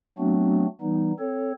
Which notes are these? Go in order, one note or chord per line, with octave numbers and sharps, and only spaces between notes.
F#3 A3 B3 C4 D4 F#4
E3 G3 B3 D#4
C4 A4 C#5